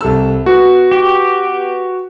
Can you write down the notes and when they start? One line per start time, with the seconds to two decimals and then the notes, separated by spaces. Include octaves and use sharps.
0.01 C2 A4 E6
0.46 B3 F#4
0.91 G4